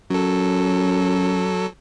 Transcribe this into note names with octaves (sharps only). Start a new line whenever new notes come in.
F#2 F#3 A4